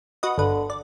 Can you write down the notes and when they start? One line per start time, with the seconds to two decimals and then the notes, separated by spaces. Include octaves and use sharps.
0.23 F#4 B4 D#5
0.38 G1 D3 B4
0.70 D5